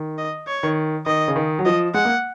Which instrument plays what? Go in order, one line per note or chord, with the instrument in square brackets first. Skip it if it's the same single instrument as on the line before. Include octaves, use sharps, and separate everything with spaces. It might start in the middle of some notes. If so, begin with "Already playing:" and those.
Already playing: [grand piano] D#3
[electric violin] D#5
C#5
[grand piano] D#3
[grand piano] D#3 [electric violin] D#5
[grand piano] C#3
D#3
F#3
[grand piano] F3 [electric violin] D#5
[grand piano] G#3 [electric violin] F#5
[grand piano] A#3